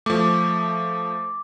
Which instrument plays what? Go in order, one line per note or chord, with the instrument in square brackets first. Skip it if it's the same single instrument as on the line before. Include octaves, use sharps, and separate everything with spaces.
[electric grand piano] F3 A3 [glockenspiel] D6